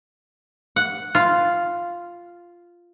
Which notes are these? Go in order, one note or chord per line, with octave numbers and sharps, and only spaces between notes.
F#5
F4